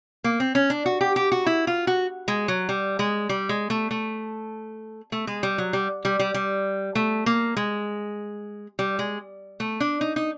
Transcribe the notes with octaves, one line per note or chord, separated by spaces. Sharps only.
A#3
C4
C#4
D4
F#4
G4
G4
F#4
E4
F4
F#4
G#3
F#3
G3
G#3
G3
G#3
A3
A3
A3
G#3
G3
F#3
G3
G3
G3
G3
A3
A#3
G#3
G3
G#3
A3
D4
D#4
D#4